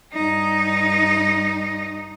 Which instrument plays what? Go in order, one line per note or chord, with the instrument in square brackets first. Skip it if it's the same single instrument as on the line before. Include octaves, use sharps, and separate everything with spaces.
[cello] G2 D#4